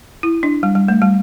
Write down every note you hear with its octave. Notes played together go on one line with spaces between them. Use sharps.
E4
D4
G3
G3
A3
G3